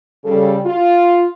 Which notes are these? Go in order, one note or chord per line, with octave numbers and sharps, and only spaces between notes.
C#3 G3 A4
F4